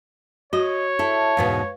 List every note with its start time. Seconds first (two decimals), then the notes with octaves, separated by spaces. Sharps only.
0.53 F#4 C#5 D#5
0.99 E4 A4
1.37 E2 G#2 B2 B4 F5